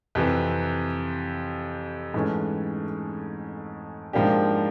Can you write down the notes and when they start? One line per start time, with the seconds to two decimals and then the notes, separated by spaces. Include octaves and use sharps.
0.15 F2 C3 E3
2.14 G#2 E3 A3 C#4
4.13 G#2 F3 A#3 D4 G4